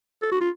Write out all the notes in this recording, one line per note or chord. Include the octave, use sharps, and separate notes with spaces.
A4
F#4
F4